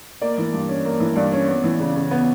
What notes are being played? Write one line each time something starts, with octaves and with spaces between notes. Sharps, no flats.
A#3 D5
E3
G2
C#4
A#3
E3
G2 D5
C#4
B3
E3
C#3
C#3
B3